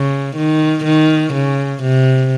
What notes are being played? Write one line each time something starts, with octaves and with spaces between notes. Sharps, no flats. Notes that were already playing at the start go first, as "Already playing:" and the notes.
Already playing: C#3
D#3
D#3
C#3
C3